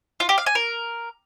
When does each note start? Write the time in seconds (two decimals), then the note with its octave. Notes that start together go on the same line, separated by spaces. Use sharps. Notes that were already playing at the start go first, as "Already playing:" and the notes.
0.20 F4
0.29 G4
0.38 F5
0.46 G#5
0.55 A#4